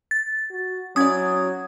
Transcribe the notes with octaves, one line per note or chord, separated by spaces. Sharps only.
A6
F#4
F#3 C#4 E4 D5 D#6 G#6